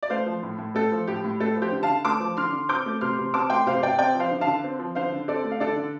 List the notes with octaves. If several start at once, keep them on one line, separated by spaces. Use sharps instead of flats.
D5
A3 C5 F5
F3
A2
A2
A3 A4
F3
A2 G4
A2
A3 A4
F3
G4 C5
D3
F5 A5
D3
A3 A5 D6
F3
D3 C6 F6
D3
C4 D6 G6
A3
C3 C6 F6
C3
C4 A5 D6
A3 G5 C6
C3 C5 F5
C3 D5 G5
C4 D5 G5
F3 C5 F5
D3
F5 A5
D3
C4
F3
D3 C5 F5
D3
C4 A4 D5
A3
F5
D3 A4 D5
D3